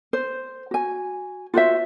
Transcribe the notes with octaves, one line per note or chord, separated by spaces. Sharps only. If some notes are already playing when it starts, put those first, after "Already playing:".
C5
F#4 G#5
F4 F#4 C5 E5